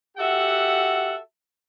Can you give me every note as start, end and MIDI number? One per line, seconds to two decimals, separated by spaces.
0.17 1.16 66
0.17 1.16 67
0.17 1.16 69
0.17 1.16 76
0.17 1.16 78